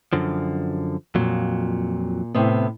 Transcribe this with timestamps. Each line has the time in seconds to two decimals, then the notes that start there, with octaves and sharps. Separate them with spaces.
0.13 F#2 D3 F3
1.15 F2 A#2 F#3
2.34 A2 C3 B3